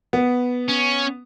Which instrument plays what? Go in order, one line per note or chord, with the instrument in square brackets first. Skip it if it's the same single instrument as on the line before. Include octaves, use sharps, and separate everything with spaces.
[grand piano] B3
[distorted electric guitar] C#4